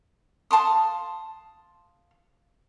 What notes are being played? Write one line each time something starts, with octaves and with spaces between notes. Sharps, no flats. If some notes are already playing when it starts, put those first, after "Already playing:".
F5 A5 C6 D#6